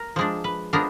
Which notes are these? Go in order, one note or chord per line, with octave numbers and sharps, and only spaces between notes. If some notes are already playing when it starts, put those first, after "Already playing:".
Already playing: A#4
F3 G#3 D4
B4
F3 G#3 B3 D4 A#4